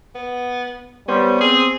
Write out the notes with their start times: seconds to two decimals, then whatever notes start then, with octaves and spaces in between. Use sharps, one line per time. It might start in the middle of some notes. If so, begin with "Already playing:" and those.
0.15 B3
1.08 G3 B3 C#4 C5 C6
1.41 C4 G#4